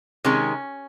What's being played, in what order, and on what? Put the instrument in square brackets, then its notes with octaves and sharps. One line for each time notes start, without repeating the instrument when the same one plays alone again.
[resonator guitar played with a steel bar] C3 D#3 G#3 C#4